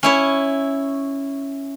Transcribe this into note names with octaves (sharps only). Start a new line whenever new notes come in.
C#4 E4 C#5